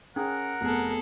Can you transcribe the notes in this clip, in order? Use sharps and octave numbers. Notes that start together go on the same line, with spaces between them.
C#4 G#4 A#4 F#5 G5
F1 B3 G#4 A4